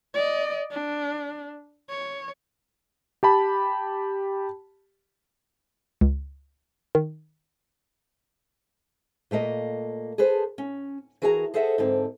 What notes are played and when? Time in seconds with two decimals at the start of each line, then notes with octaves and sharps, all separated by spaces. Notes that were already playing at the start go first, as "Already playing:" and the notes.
0.14 D5 D#5
0.71 D4
1.90 C#5
3.23 G4 A5 B5
6.01 C#2
6.95 D#3
9.31 A#2 A3 A#3 D#5
10.18 G#4 A4 B4 C5
10.58 C#4
11.22 E3 F#4 G#4 A#4 G5 A#5
11.54 G#4 A4 C5 D#5 E5 F#5
11.78 G#2 D3 C4